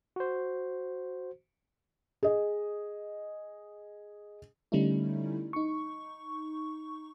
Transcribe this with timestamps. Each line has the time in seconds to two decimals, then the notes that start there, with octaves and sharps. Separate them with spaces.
0.16 F#4 C5
2.23 G#4 D#5
4.72 D3 G3 A3 C#4 D#4 E4
5.53 D#4 C#6